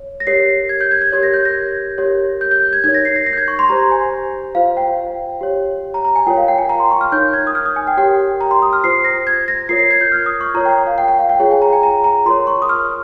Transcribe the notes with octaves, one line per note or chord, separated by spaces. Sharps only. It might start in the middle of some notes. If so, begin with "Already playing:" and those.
Already playing: C#5
A#6
G4 A#4 C#5 C7
G#6
G6
G#6
G#6
G4 A#4 C#5 G#6
A#6
G6
A#6
G4 A#4 C#5
G6
G6
G6
G#6
D#4 A#4 C#5 G#6
A#6
C7
A#6
A#6
G6
G#6
C#6
C6
G4 C5 A#5
G#5
F4 C5 F5
G5
G4 C#5
A#5
A#5
G#5
F4 A#4 C#5 G5
F5
G5
G#5
A#5
C6
C#6
F6
D#4 A#4 C#5 G6
G#6
D#6
F6
D#6
G#5
G5
G4 A#4 C#5 G5
A#5
C6
D#6
F6
F4 C5 C7
A#6
G#6
A#6
F4 A#4 C#5 C7
C7
G#6
G6
F6
D#6
C#6
F4 A#4 C#5 A#5
G5
F5
G5
G5
F5
G5
F4 G#4 C#5 G5
G#5
A#5
G#5
A#5
A#5
F4 A#4 C#5 C6
C#6
D#6
F6